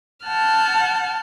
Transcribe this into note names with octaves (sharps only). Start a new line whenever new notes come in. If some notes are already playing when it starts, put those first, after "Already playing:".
F#5 A5 F6 G6